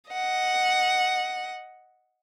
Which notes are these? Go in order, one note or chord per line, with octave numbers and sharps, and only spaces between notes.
D#5 F#5